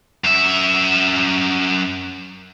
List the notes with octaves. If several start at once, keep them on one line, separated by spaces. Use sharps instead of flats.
F#2 E5